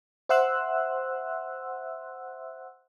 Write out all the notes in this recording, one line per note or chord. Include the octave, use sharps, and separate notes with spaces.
C5 E5 F#5 C6 E6 F#6